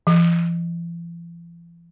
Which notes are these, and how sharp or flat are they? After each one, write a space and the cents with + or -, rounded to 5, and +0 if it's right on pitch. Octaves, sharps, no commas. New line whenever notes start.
E3 +45